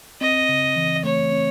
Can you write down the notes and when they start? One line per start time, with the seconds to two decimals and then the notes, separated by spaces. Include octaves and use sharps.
0.21 C4 D#5
0.49 C#3
0.76 E3
1.04 A3 C#5
1.32 C4